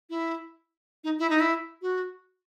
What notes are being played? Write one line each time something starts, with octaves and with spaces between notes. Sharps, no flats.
E4
D#4
E4
D#4
E4
F#4